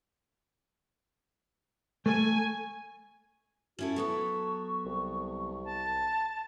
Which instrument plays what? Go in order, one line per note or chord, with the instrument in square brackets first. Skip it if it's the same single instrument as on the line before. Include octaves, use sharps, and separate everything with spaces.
[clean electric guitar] A3 [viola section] G#5
[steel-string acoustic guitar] C#4 E4 A4 [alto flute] F#4
[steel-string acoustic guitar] F#3 B3 A4 [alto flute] C#6
[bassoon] C2
[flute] A5